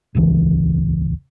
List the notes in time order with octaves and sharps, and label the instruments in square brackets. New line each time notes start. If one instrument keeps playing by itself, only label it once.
[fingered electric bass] D#1 G#1 C#2 E3